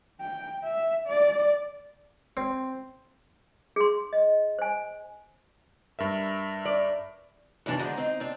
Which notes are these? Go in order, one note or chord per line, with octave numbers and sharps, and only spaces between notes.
G5
E5
D5
C4
G#4 C6
D#5
C5 G#5
G2 A#4 E5
D5
G2 C3 E3 D4
D3 D#3 F3 G#3
C4 D#4
C4 D4